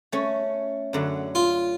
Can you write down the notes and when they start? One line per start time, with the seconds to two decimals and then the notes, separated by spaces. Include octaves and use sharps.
0.12 A3 C#4
0.93 F#2 D3 F#3
1.35 F4